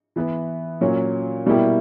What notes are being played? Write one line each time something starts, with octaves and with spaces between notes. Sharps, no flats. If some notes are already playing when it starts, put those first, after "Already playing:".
E3 B3 E4 B4
A#2 F#3 C#4
B2 G3 A#3 E4 G4